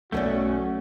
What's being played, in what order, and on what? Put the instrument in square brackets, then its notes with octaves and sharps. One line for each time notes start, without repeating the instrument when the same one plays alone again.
[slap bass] B1 B2 [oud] G2 A#4 D5 [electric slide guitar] A3 C#4 [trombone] F#4